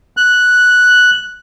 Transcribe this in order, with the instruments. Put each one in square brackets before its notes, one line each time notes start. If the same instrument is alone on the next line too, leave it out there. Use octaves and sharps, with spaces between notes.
[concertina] F#6